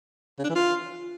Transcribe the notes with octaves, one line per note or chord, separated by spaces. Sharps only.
C#3
D4
E3
F4